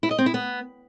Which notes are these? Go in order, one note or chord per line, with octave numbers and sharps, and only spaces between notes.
E4
D#5
C4
E4
B3